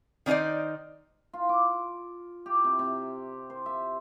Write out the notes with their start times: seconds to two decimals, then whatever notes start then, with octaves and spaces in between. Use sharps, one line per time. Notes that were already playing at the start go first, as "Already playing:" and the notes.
0.26 D#3 D4 D#4 C5 D5
1.33 F4
1.49 D6
2.46 G4
2.64 C3
2.79 C3
3.50 C5
3.66 E5